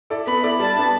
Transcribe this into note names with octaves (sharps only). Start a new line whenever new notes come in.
E4 A4 D5
B3 B5
E4 A4 D5
G3 A5
B3 D4